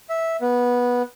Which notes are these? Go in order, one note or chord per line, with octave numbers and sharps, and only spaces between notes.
E5
B3